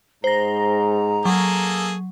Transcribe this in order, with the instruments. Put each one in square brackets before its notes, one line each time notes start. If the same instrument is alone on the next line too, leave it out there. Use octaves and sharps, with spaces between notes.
[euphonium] G#2 [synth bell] C5 A#6 [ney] A#5
[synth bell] F#3 [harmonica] A#3 G#4 A4